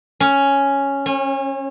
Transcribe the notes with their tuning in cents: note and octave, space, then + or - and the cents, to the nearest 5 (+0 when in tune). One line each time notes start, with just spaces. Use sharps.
C#4 +0
C#4 -35